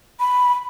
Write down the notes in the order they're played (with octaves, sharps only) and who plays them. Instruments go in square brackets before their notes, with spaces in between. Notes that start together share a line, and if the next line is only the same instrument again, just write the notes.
[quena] B5